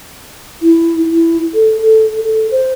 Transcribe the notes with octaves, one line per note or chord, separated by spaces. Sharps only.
E4
E4
A4
A4
A4
C5